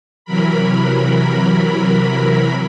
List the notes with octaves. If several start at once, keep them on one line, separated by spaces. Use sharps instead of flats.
C3 E3 F#3 A#4 B5